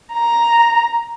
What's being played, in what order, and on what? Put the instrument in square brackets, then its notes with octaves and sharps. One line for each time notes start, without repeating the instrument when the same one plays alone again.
[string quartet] A#5